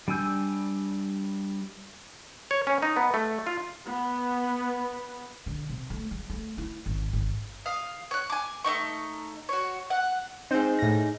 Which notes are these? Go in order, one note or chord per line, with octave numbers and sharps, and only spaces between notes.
G3 D4 G#5 E6 G6
C#5
C#4
D#4
B3
A3
F4
B3
D3
C3
A3
G#3
A3
E4
G#1
G#1
F5 D#6
C#5 F#6
G#5 D6
A3 B3 D#4 C#6
F#4 C#5
F#5
C4 D#4 G#4 C5
A2 A#6